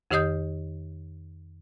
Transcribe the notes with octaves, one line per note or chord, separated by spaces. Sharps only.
F2 D#3 G4 D#5 D#6 G6